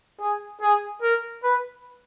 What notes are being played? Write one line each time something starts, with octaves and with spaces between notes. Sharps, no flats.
G#4
G#4
A#4
B4